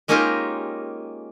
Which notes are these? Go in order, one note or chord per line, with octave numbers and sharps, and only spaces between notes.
G#3 A#3 C#4 D#4 F4 G4